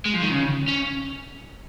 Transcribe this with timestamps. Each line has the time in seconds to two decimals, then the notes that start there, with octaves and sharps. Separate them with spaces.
0.06 G#3
0.14 F3
0.22 D#3
0.31 C#3
0.68 C#4